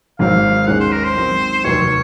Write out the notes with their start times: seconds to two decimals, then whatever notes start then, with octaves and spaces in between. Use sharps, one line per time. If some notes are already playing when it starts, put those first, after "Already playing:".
0.19 G#1 G#2 F#3 F5
0.67 D#2 D#3 G#3 C#4 F#5
0.80 C5
0.92 A#4
1.04 C5
1.16 G#2 D#3 F#3 C4
1.64 F1 D#2 D#3 F#3 C#5